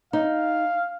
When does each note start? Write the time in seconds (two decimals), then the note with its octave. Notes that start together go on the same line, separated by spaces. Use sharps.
0.13 D#4 F5